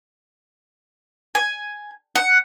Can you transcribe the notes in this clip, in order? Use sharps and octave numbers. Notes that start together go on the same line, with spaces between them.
G#5
F#5